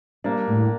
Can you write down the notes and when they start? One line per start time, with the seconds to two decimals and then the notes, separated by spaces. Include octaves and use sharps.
0.24 G3 A#3 D4
0.47 A2